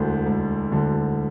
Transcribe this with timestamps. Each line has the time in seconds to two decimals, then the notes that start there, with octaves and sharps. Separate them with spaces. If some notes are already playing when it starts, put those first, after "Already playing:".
Already playing: E1 D2 D3
0.26 E1
0.72 D2 D3